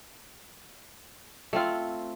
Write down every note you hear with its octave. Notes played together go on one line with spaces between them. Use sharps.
A3 C4 F4